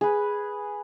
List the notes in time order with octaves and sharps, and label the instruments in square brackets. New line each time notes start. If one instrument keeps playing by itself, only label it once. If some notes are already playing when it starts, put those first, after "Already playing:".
[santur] G#4 B4